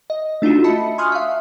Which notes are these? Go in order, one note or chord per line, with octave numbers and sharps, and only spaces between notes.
D#5
A3 D4 D#4 F4 F#4
D#5 E5 A5 B5 C#7
G#5 C6 C#6 D#6 F6 F#6
E5 F5